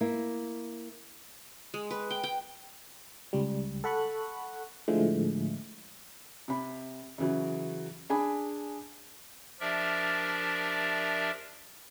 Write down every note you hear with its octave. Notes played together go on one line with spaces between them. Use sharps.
A#3 E4
G#3
B4
G5
G5
C#2 G3
A4 F#5 B5 C#6 F#6
A2 D3 F3 G#3 A3
C3 B5
C#3 E3 F#3
D4 G#4 G#5 B5
F3 D4 G4 A#4 D5 E5